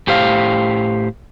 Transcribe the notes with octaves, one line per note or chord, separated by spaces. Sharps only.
A2 G4 C5 F5